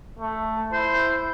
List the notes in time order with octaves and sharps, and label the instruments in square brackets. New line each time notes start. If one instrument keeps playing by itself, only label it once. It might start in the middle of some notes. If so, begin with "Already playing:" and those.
[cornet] A3
[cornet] E4 [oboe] C5